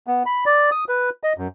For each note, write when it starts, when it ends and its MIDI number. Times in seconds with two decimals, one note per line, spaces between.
0.07 0.23 59
0.26 0.45 83
0.46 0.70 74
0.72 0.85 87
0.89 1.10 71
1.23 1.33 75
1.38 1.48 42